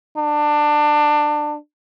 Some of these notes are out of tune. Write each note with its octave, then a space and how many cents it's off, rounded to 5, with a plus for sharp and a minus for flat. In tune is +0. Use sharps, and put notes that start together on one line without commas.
D4 +20